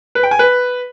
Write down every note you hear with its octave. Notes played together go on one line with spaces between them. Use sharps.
B4
G5
G#5
B4